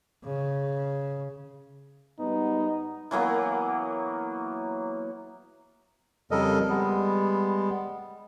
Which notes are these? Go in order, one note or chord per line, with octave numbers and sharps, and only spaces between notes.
C#3
G#2 G3 B3 D#4
E3 F#3 A#3 B3
F2 C#3 G3 A4 A#4 D#5
G3 G#3 B3